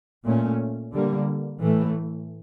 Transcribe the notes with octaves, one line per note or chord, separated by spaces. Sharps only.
A#2 A3 C#4
D3 G3 A#3
A2 E3 A3